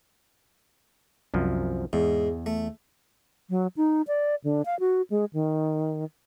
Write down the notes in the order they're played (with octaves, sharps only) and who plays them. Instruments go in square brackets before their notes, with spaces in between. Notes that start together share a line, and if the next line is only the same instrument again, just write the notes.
[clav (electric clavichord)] C2 F#2 F3
[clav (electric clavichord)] E2 [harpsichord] G#2
[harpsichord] A3
[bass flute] F#3
D#4
D5
D3
F5
F#4
G#3
D#3